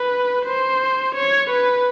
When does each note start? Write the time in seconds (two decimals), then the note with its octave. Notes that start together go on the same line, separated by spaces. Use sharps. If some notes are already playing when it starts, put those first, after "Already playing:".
Already playing: B4
0.46 C5
1.15 C#5
1.50 B4